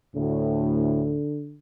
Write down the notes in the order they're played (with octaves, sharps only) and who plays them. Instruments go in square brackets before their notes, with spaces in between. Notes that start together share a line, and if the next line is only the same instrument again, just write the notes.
[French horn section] D2 A2 [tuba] D3